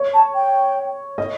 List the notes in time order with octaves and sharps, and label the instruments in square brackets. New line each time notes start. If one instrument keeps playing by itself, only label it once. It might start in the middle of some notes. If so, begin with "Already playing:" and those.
Already playing: [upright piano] C#5
[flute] A5
G5
[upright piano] D#5